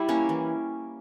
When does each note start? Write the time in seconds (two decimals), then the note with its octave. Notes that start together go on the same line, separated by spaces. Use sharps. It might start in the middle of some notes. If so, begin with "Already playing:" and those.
Already playing: G3 E4 G4
0.08 A#3 C#4
0.29 E3